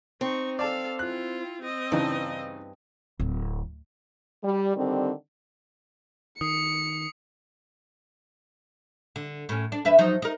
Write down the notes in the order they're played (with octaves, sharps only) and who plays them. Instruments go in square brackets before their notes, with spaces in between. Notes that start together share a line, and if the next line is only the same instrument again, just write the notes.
[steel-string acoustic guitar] C4 [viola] D#4 C#6
[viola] A4 F5 [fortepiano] D5 A5
[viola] E4 F4 [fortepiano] F#6
[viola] C4 D#5
[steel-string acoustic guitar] G2 [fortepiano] C#3 E3 D#4
[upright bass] D1
[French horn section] G3
D3 D#3 G3 C4
[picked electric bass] D#3 [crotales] D#6 C7 [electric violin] C#7
[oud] D3
A2 C#4
D4
E2 B4 E5
F3 F#3 D#4
D#4 A#4